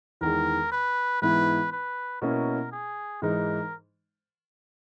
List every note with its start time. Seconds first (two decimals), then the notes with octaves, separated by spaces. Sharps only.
0.21 E2 D#3 G#3 A#4
0.72 B4
1.22 G#2 E3 B3 E4 B4
1.72 B4
2.22 B2 A#3 C#4 E4 A#4
2.72 G#4
3.22 G#2 E3 G#3 D#4 A#4